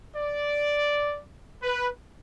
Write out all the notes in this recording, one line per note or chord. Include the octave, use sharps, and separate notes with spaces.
D5
B4